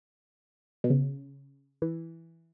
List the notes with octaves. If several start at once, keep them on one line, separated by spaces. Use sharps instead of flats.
B2
C#3
E3